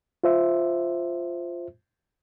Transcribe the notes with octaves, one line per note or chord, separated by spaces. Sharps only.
F4 C5 E5